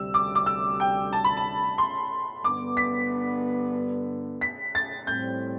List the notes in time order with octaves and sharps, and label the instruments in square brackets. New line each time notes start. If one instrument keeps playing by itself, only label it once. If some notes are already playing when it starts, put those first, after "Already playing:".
Already playing: [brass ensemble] D2 C3 G3 [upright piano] E6
[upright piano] D6
D6
E6
G5
A5
B5
A5
C6
[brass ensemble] G2 D3 G3 B3 D4 [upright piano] D6
[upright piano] B6
B6
A6
[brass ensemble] A2 G3 C4 [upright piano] G6